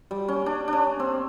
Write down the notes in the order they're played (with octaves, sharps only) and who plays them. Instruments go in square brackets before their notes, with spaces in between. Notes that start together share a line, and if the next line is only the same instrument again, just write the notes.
[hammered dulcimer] G3
C#4
D4
C#4 D4
C4